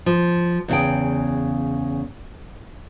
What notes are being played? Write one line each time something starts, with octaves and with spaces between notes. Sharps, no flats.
F3
E2 C#3 G5